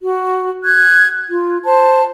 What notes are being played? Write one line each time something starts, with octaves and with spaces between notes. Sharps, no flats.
F#4
F#6 G#6
F4
C5 A5